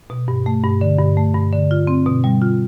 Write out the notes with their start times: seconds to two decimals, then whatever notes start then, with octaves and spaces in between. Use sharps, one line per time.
0.10 B2
0.28 G2
0.46 A3
0.64 G2
0.81 D3
0.99 G2
1.17 A3
1.35 G2
1.53 D3
1.71 F4
1.87 C4
2.06 B2
2.24 G3
2.42 F4